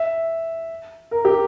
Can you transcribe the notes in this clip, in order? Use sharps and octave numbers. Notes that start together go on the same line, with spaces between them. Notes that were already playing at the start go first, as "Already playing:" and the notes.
Already playing: E5
A#4
G4